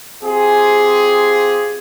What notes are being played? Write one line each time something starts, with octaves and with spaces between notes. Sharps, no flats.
C4 F4 G4 G#4